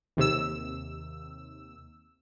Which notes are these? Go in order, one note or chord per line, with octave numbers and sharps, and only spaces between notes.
D#2 C3 E6